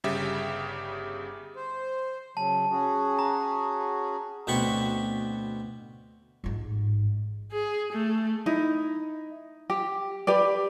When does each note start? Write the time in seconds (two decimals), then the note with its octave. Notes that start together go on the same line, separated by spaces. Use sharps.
0.04 G1 C#3 G3 G4 E5
1.56 C5
2.37 C#3 F#3 A5
2.71 C#4 F#4 G#4
3.19 A#5
4.47 D2 B2 B3 C4 B5 C#6
6.44 A1 G#2
7.52 G#4
7.93 A3
8.46 D#4 E4
9.70 G4
10.27 G4 B4 D5